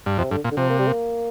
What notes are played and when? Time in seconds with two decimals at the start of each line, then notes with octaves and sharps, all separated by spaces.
0.06 G2
0.18 F2 C3
0.31 G2 D3
0.44 A#2
0.52 D3
0.57 C3 F3
0.69 A#3
0.79 G3
0.88 A#3